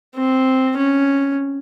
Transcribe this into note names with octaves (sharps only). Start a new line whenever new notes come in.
C4
C#4